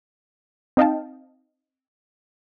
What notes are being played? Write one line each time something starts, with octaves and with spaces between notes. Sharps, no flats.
C4 D#4 D#5 F5 G5 A5